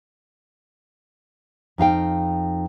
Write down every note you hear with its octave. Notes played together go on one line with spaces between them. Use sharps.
F2 D#4 F5 G5